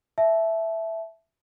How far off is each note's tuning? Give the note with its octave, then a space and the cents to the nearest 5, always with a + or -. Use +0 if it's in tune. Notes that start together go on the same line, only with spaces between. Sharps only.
E5 +0 A5 -25